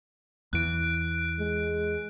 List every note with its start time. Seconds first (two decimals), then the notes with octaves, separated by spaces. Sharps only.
0.53 E2 E3 F#6 D7
1.39 G#3